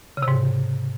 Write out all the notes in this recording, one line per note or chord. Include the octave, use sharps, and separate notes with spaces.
C#3
C3
G#2